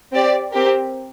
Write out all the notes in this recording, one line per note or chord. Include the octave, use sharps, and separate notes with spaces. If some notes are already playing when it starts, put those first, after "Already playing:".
C4 G4 D5
C4 G4 A#4